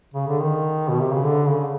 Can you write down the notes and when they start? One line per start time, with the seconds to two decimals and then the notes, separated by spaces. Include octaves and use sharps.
0.14 C#3
0.28 D3
0.40 D#3
0.89 B2
1.01 C3
1.13 C#3
1.25 D3
1.47 C#3